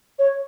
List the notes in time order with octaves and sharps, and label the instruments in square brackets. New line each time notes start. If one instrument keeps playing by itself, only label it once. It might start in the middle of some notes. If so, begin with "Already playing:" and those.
[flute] C#5